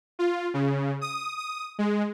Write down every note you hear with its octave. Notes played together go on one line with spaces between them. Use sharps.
F4
C#3
D#6
D#6
G#3